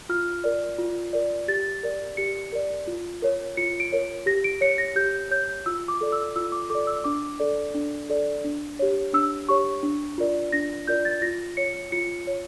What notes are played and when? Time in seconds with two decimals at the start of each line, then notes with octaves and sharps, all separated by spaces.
0.09 F4 F6
0.44 A#4 D5
0.79 F4
1.13 A#4 D5
1.48 G4 A6
1.83 A#4 D5
2.17 G4 C#7
2.53 A#4 D5
2.87 F4
3.22 A#4 C#5
3.57 F4 C#7
3.80 D7
3.92 A#4 C#5
4.26 G4 A#6
4.44 D7
4.61 C#5 C#7
4.78 A#6
4.96 G4 G6
5.31 C#5 G6
5.66 F4 E6
5.88 D6
6.01 A4 D5
6.12 E6
6.36 F4 E6
6.52 D6
6.70 A4 D5 D6
6.87 E6
7.04 D4 D6
7.40 A4 D5
7.74 D4
8.10 A4 D5
8.44 D4
8.79 G4 C#5
9.13 D4 E6
9.49 G4 C#5 C#6
9.83 D4
10.18 F4 A#4 D5
10.52 D4 A#6
10.87 F4 A#4 D5 G6
11.05 A6
11.22 F4 A#6
11.57 C#5 C#7
11.92 F4 C#7
12.27 C#5